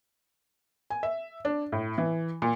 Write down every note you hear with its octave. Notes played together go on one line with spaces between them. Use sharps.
G#5
E5
D4
A2
E3
A#2